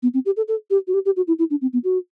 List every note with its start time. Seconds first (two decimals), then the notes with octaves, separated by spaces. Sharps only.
0.03 B3
0.14 C4
0.26 G4
0.37 A4
0.48 A4
0.70 G4
0.87 F#4
0.94 G4
1.05 G4
1.16 F#4
1.27 E4
1.39 E4
1.50 D4
1.62 C4
1.73 B3
1.84 F#4